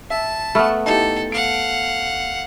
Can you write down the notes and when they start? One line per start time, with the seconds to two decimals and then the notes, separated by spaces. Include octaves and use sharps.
0.10 E5 A5
0.55 A3 B3 B5 C#6 F6
0.86 D#4 E4 G4 A4
1.32 F5 F#5 D7